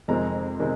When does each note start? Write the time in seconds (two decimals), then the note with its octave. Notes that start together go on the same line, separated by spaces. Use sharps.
0.08 F2 C3 D#3 G#3 C4 A#5
0.60 C3 D#3 G#3 C4